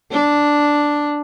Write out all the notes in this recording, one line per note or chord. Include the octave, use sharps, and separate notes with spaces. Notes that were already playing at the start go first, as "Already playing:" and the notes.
D4